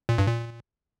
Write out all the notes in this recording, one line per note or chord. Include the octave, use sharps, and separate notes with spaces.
A#2
G2
A#2